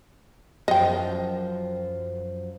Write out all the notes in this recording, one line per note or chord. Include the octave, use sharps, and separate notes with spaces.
F#2 F3 D#5 G5